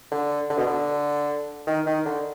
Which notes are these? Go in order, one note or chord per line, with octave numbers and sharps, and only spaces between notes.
D3
D3
B2
D3
D#3
D#3
D3